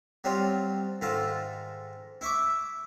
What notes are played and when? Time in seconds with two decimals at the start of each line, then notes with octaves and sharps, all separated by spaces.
0.24 F#3 G3 C4 F4
1.01 G#2 D#3 F4 A4 A5
2.21 E4 E5 C#6 D6